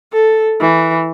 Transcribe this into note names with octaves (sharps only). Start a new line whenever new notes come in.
A4
E3